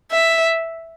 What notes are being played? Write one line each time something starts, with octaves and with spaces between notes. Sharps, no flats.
E5